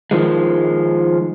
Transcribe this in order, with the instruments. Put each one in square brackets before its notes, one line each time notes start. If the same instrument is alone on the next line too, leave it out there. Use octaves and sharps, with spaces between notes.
[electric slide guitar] D#3 F3 G#3